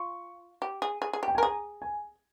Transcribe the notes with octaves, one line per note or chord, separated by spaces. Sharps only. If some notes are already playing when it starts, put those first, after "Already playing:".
Already playing: F4 C#6
G4
G#4
G#4
G#4
G4
G5
G#5
A#4
G#4 A#5
G#5